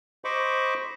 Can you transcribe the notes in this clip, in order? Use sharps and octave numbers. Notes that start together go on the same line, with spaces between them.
C5 D#5 B5 C#6 D6